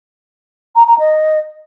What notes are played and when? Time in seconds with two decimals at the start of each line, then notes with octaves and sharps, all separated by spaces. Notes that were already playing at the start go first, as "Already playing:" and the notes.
0.76 A#5
0.87 A#5
0.99 D#5